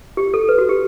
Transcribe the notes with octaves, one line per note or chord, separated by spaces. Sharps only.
G4
A4
B4
F#4
G4